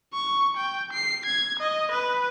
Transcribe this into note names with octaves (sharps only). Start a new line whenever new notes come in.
C#6
G5
C7
G#6
D#5
B4